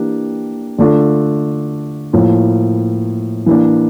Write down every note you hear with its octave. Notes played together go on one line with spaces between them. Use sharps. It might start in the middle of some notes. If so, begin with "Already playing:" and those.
Already playing: E3 A#3 D4 G4
D3 A3 D4 F4
A2 F3 A#3
E3 A#3 D4